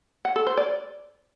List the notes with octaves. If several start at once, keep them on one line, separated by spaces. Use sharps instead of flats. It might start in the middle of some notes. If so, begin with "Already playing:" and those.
F#5
A4
C5
D5